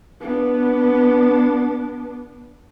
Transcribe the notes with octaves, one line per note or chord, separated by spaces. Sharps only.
B3 D4